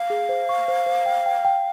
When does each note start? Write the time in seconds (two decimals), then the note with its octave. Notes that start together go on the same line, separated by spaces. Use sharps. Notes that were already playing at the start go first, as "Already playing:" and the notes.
Already playing: F5
0.10 G#4
0.29 C5
0.49 C#6
0.68 C5
0.86 C5
1.06 G5
1.26 G5
1.45 G5